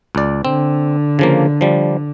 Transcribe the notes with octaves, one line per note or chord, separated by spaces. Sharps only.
C#2 D5
D3 C4
C#3 F3 A#3
F3 G3